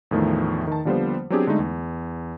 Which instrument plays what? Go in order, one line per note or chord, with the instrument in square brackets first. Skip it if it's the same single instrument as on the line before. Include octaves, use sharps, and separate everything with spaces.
[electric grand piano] E2 A2 D#3 F3 A3
D#3 A5
D3 F3 G3 A#3 B3 C5
F#3 B3 C4 D4 G4 G#4
D3 G#3 A3 D#4
E2